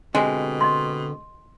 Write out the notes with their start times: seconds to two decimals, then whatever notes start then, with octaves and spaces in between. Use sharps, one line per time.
0.15 B2 D3 G#3 C4 G4
0.61 D#5 C6